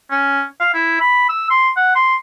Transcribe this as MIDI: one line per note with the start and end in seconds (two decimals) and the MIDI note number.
0.11 0.43 61
0.60 0.70 77
0.74 0.97 64
1.01 1.26 83
1.29 1.50 88
1.50 1.70 84
1.77 1.95 78
1.95 2.15 84